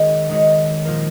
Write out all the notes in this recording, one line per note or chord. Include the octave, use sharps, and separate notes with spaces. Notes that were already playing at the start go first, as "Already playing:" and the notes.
Already playing: D#3 G#3 D#4 F#4 C#5
D#3 G#3 D#4 F#4 C#5
A#2 F3 A#3 F4 A#4